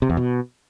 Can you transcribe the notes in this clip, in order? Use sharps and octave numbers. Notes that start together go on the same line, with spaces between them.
C3
E2
B2